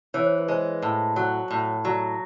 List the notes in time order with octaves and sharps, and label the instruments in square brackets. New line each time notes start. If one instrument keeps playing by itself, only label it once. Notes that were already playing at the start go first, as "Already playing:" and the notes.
[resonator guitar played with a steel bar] E3 [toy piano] C#5
[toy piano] C5
B4
[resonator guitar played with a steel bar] G#3 [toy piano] C5
[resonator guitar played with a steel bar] A2
F#3
A2
F#3